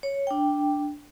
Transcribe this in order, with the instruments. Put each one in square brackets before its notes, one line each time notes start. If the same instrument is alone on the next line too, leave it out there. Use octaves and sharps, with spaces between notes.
[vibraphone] C#5
D4 G5